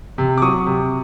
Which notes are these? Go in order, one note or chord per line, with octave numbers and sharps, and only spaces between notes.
C3
D6
F#3 C#6 D#6
C3